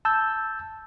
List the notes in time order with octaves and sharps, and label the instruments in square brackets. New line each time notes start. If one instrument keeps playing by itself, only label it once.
[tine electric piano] A5 E6 G6